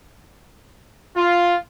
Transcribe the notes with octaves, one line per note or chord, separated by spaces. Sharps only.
F4